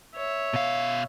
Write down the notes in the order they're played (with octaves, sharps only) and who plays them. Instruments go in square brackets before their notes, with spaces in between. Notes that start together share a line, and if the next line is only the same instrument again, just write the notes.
[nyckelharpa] C#5 E5
[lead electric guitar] B2 F5